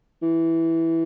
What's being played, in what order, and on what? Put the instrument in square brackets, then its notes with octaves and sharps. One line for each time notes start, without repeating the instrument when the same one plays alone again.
[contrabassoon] E3